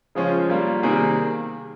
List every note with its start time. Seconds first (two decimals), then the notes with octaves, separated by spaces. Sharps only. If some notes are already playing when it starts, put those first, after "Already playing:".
0.15 C#3 F3 G#3 C#4 F4 G#4
0.49 G3 A#3 F4
0.83 C3 D#3 G3 A#3 G#4